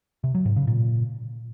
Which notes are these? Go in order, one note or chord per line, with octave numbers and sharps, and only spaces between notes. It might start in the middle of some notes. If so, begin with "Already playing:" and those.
C3
F#3
G#2
C#3
A#2